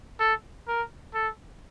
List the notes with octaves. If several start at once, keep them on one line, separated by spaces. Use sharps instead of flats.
A4
A#4
A4